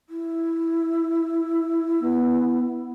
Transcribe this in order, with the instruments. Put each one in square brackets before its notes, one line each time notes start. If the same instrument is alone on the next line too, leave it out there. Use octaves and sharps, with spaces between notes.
[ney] E4
[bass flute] B3